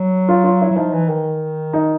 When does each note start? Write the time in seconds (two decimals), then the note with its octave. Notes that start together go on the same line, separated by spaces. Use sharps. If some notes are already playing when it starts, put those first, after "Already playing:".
Already playing: F#3
0.29 F4
0.44 F4
0.62 E4
0.71 F#3
0.77 F3 D#4
0.93 E3
1.09 D#3
1.73 D#4